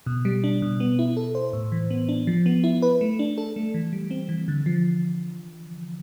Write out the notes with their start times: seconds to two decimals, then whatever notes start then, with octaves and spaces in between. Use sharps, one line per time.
0.06 B2
0.25 G3
0.44 D4
0.62 B2
0.80 B3
0.99 E4
1.17 A4
1.35 C5
1.53 A2
1.72 E3
1.90 B3
2.09 D4
2.27 F3
2.46 B3
2.64 E4
2.82 B4
3.01 A3
3.19 D4
3.38 A4
3.56 A3
3.74 E3
3.93 G3
4.11 C4
4.29 E3
4.48 D3
4.66 F3